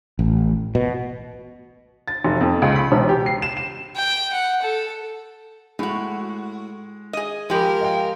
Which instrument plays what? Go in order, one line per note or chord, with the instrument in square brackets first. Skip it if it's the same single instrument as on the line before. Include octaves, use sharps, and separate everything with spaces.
[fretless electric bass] A1
B2
[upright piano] A6
F1
F2
C#2
B5
E1
G4
C7
E7
E7
[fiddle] G5
F#5
A4
[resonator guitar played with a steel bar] A2 F#4 [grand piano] G#3
[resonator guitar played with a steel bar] G#4 D#5
[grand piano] F3 G5 B5 [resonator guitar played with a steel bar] G#3 G4 [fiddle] A#4
[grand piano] D#5 F5 G5